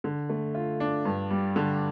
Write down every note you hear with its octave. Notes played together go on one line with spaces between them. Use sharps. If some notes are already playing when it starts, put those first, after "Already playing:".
D3
A3
F4
D4
G2
G3
D3